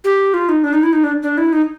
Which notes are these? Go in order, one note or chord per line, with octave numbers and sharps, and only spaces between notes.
G4
F4
D#4
D4
D#4
E4
D#4
D4
D4
E4
D#4